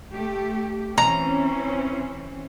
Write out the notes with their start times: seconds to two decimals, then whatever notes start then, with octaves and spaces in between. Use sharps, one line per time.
0.12 A3 G4
0.98 E3 C4 C#4 A#5